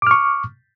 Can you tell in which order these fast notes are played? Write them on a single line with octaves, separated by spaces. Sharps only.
D6 F6 C#6